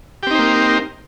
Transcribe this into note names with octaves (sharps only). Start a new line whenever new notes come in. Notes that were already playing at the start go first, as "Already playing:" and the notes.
A#3 C4 D#4 G4 C5